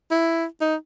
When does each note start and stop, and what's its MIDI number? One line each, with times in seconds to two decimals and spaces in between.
0.11 0.45 64
0.61 0.75 63